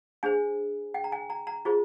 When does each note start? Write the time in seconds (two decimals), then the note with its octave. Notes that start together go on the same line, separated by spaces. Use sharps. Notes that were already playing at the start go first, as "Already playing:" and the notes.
0.23 D4 G#4 C5 G#5
0.94 G5
1.04 A#5
1.12 G#5
1.30 A#5
1.47 A#5
1.65 F4 G#4 C5